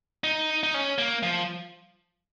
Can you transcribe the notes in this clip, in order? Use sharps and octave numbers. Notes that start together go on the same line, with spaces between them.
D#4
D#4
C#4
A#3
F3